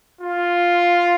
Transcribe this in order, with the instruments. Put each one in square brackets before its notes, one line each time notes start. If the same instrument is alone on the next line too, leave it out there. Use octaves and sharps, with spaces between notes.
[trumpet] F4